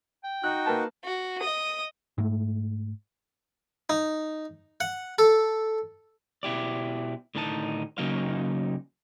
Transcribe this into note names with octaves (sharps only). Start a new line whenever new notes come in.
G5
D#4 F#4 F#6
A#3 B4 A5
F#4
D#5 D#6
G#2 A3
D#4
F#5
A4
B2 E4 G4 D5
A2 D3 D#3 D#4 A5
C#3 F#3 A#3 D#4 F5